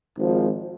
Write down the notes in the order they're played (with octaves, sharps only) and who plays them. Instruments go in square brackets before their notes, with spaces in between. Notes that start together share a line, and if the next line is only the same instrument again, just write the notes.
[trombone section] G#1 G#2 F3